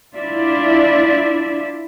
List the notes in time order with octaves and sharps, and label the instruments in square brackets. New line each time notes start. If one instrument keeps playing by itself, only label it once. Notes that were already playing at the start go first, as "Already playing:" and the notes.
[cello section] D4 E4 F4 D5 E5